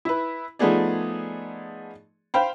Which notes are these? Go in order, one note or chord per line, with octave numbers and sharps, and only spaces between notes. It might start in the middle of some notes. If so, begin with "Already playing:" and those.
E4 B4
F3 A3 B3 D#4 G#4 D5
C5 F5 G5 B5